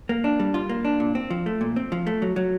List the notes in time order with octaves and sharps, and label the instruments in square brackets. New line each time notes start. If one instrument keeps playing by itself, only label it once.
[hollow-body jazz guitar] A#3
D4
G3
F4
A#3
D4
A#2
C4
F3
A3
A#2
C4
F3
A3
F#3
F#3